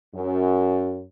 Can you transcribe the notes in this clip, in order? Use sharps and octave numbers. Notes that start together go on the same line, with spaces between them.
F#2